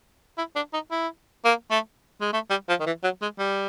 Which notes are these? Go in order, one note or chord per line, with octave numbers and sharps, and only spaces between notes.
E4
D4
D#4
E4
A#3
A3
G#3
A3
G3
F3
D#3
E3
F#3
G#3
G3